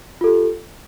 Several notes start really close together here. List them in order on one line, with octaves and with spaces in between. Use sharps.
F4 A4 G4